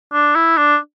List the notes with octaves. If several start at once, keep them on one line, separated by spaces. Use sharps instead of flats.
D4
E4
D4